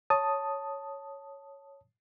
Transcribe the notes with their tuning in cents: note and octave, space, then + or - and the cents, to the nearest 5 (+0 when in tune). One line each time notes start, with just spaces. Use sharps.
C#5 +0 A5 +5 D#6 +0